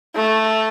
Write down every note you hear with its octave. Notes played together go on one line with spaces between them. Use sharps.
A3